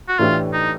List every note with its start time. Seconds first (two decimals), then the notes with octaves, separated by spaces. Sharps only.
0.08 F#4
0.18 A2 E3 A3 D4 F4 G4
0.53 D#4